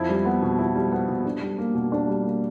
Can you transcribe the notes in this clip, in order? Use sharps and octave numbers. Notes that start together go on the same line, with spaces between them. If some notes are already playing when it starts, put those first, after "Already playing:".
Already playing: F2 E4
G3
B3
B2
E4
G3
B3
B2
D4
G3
A#3
B2
D4
G3
A#3